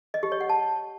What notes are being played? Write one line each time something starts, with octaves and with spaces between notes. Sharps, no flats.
D#5
G4
C#5
F#5
A5